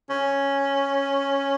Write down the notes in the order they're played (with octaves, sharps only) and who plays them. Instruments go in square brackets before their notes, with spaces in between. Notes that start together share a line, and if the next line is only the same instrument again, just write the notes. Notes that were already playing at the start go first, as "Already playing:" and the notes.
[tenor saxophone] C#4